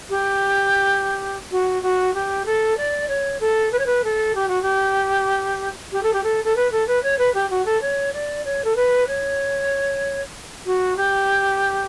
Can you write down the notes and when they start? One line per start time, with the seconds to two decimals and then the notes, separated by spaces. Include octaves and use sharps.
0.09 G4
1.51 F#4
1.82 F#4
2.14 G4
2.45 A4
2.77 D5
3.08 C#5
3.40 A4
3.72 B4
3.78 C#5
3.86 B4
4.04 A4
4.35 G4
4.48 F#4
4.62 G4
5.92 G4
6.03 A4
6.13 G4
6.23 A4
6.44 A4
6.56 B4
6.71 A4
6.87 B4
7.03 C#5
7.18 B4
7.34 G4
7.50 F#4
7.65 A4
7.81 C#5
8.13 D5
8.44 C#5
8.64 A4
8.75 B4
9.07 C#5
10.65 F#4
10.96 G4